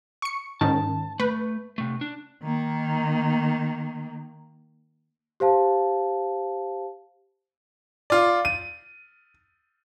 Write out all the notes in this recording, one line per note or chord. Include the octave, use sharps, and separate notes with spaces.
C#6 C#7
G#2 D#3 C#4 A5
A3 B4
C3 A3
D4
D#3 A#3
G4 C5 F5 A5
F4 D5
D#7